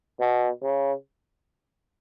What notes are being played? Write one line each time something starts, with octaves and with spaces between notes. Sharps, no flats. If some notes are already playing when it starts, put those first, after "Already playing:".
B2
C#3